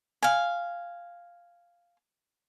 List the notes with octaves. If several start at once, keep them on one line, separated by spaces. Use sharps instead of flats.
F5 G#5